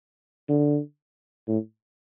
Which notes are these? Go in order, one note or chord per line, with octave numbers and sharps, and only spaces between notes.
D3
A2